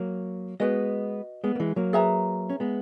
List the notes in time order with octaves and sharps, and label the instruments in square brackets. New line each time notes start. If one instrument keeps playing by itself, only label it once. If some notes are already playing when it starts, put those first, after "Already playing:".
Already playing: [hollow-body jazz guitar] F#3 A#3
[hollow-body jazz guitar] G#3 B3 [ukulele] F#4 B4 D#5
[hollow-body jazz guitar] G#3 B3
A#3
E3 G#3
F#3 A#3
[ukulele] G#4 B4 E5 A#5
[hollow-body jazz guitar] C#4
G#3 B3